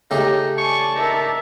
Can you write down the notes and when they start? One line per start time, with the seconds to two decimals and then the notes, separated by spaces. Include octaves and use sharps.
0.11 C#3 A3 D#4 G4
0.58 D5 G#5 A5 C#6
0.96 D#4 A#4 E5